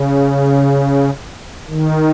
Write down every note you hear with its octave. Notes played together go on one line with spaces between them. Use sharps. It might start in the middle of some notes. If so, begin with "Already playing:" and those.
Already playing: C#3
D#3